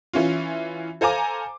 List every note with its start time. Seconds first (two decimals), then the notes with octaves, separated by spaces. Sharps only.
0.13 E3 C#4 F4
1.01 A4 C5 F5 G#5 A#5 D6